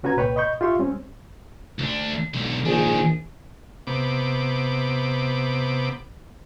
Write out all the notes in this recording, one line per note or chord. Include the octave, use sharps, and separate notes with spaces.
D3 C#4 F#4 B4 A#5 G#6
C2 A#2 B4 C#5 G5
D#5 B5 C#6 G6
F4 G4 E5 C6 C#6
G3 C4 C#4
D2 D4
B1 D3
A#1 D#3 D4 G#4
C3 B3 D6